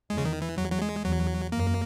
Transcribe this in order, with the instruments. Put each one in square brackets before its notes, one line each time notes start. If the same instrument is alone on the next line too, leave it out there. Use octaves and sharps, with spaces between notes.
[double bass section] E2 [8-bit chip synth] G#3
[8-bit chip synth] C#3
D#3
E3
[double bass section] E2 [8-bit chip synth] F#3
[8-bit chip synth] F#3
G#3
[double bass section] E2 [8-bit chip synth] F#3
[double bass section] F#2 [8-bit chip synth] A#3